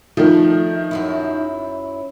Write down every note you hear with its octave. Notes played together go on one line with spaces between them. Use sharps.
D#3 F3 A3 D4
F#2 F#3 E4